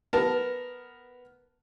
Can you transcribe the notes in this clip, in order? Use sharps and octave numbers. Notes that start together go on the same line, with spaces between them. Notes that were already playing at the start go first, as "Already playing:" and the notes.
B3 A#4 A5